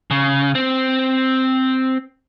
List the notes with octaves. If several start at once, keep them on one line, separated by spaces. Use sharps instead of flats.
C#3
C4